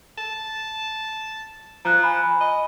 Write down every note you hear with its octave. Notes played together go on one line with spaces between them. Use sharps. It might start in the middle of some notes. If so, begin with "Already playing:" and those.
A5
F3 A#5 F#6
G#5 B5
D#5